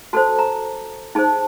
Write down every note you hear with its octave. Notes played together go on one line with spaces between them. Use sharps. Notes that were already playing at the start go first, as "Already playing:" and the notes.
F#4 A4 C5 A5
A#5
D#4 G#4 C5 A5